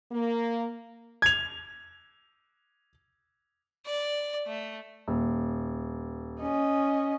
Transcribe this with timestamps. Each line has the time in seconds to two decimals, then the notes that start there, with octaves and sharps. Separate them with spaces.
0.12 A#3
1.22 G#6 F7
3.86 D5
4.47 A3
5.08 D#1
6.42 C#4 D#5